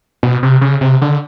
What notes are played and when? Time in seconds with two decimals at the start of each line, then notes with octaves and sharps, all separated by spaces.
0.23 B2
0.43 C3
0.61 C#3
0.81 C3
1.02 D3